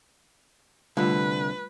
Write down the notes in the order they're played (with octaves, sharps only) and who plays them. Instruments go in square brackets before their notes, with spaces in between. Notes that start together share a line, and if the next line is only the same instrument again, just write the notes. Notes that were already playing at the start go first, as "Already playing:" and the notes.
[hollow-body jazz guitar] C2 D3 [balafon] G3 A3 F4 [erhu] B4